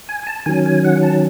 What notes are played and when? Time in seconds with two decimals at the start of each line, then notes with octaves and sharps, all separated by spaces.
0.09 G#5
0.23 G#5
0.27 A5
0.46 D#3 F#3 C#4 G#5
0.66 G#5
0.84 F#5
1.03 A5